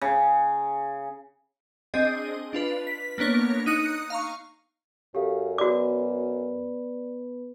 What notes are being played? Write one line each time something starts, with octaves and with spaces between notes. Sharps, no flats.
C#3
C4 D4 G#4 D#5
D4 F4 B4
B6
A#3 B3 D4 C#5 A#6
D#4 D#6 F#6 C#7 D#7
F5 A#5 C#6
F#2 G4 A4 F5
B3 F#4 B4 D5 D6